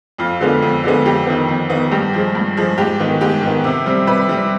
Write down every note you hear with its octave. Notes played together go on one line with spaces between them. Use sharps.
F2 F4
D3 G#3 B3
F2
D3 G#3 B3
F2 G4
D#3 B3
F2
D#3 B3
G2 G4
F3 G#3
G2
F3 G#3
G#2 G4
D#3 B3
G#2 G4
D#3 B3
C3
G3 C4
C3 B4
G3 C4